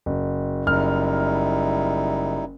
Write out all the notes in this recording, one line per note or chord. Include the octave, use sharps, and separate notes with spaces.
F#1
F#1 G3 D#4 E4 F6